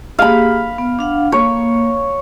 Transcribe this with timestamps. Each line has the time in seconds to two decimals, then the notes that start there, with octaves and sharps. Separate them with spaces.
0.19 A#3 G4 G#4 F5 B5
0.78 B3
0.99 D4 F5 F#5
1.32 A#3 C#5